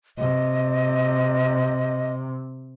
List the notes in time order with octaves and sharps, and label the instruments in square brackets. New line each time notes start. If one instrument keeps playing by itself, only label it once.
[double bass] C3 [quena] D#5